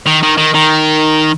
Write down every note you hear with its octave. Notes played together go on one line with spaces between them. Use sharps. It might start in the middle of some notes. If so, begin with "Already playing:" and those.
D#3
D#3
D#3
D#3